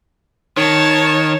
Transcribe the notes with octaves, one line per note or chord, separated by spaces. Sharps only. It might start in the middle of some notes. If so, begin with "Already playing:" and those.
D#3 C#5 A5